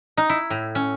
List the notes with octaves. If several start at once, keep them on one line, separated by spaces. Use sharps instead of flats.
D#4
E4
A2
C#4